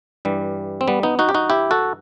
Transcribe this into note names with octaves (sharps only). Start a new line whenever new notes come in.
G2 E3 G3
C4
G3 B3
B3 D#4
D#4 F#4
G4
D#4 F#4
E4 G4
F#4 A4